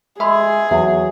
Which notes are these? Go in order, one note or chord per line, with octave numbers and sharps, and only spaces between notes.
G#3 G#4 A4 E5 B5 C6
E2 F#3 E4 E5